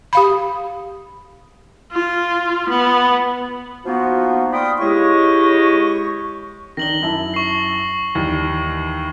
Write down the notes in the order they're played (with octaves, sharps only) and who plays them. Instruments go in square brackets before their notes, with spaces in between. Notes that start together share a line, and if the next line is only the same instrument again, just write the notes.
[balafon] G4 F5 B5
[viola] F4
B3
[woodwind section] F3 A#3 B3 D#4 F4 F#4
D5 F5 G5 B5 C6 D#6
C#3 G#3 E4 G4 D#5 C#6
[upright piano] D#3 D4 [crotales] A#6 F#7 G7
[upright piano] F#2 E4 A5
[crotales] C#6 C7
[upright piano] D#2 E3 G3